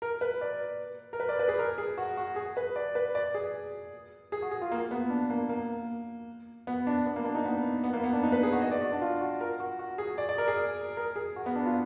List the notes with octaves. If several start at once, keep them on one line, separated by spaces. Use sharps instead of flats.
A#4
B4
D5
A#4
B4
D5
B4
G#4
A#4
G#4
F#4
F#4
G#4
B4
D5
B4
D5
G#4
G#4
F#4
G#4
F4
A#3
B3
D4
A#3
A#3
B3
D4
B3
A#3
D4
D#4
B3
B3
A#3
B3
D4
D#4
B4
G#4
F#4
D#5
D5
F#4
D4
F4
F#4
A#4
F#4
F#4
G#4
D5
D5
A#4
G#4
A#4
G#4
F#4
B3
D4
F4